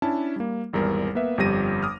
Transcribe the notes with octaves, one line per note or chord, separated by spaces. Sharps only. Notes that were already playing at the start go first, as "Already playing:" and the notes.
C#4 D4 E4 A5
G3 A#3
G#1 E2 G3 A#4
A#3 B3 B4 E5
G1 F2 G3 G4 A#6 D#7
D6 D#6 F6